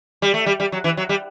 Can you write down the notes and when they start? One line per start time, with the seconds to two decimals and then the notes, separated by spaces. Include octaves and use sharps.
0.22 G3
0.34 A3
0.46 G3
0.60 G3
0.72 F#3
0.84 E3
0.97 F#3
1.09 G3